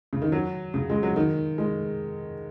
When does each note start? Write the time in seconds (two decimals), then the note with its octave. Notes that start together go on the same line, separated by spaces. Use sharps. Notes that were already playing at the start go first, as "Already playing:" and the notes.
0.13 C#3
0.22 D#3
0.32 F#3
0.74 C#3
0.90 G#3
1.03 F#3
1.16 D#3
1.58 G#3